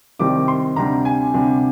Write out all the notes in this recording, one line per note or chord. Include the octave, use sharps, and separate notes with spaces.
C2 C3 D#3 G3 C4 D6
C6
D2 C3 G3 D4 A#5
G#5
D2 C3 G3 D4